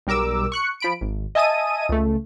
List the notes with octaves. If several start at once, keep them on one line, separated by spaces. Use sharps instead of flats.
B1 G3 A#4 D6 E6
C#6 F#6 C#7
F3 B5 D7
G#1
D#5 E5 G#5 A5 D#6 D#7
C#2 A3